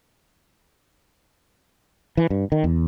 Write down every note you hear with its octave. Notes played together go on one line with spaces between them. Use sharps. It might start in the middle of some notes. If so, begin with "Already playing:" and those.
E3
G2
D#3
E2